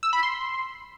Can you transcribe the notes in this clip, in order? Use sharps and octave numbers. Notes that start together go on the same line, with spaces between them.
E6
B5
C6